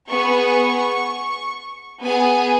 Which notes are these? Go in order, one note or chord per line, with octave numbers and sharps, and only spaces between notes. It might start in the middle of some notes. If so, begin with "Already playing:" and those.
B3 G#4 C#6
B3 G#4 G#5